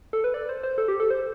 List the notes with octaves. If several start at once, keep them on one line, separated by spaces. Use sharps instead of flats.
A4
B4
D5
C5
C5
A4
G4
A4
C5